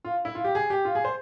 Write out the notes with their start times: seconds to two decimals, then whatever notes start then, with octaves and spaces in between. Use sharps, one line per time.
0.04 F4
0.25 E4
0.35 F4
0.44 G4
0.55 G#4
0.70 G4
0.85 F4
0.95 G#4
1.05 C5